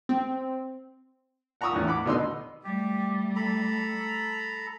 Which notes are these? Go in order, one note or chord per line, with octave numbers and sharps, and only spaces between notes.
C4
F#5 A#5 B5 C#6 D#6 E6
E2 A2
F#5 B5 D6
B2 D3 D#4 B4 C6 E6
G3 A3 G4
A4 A#5 B5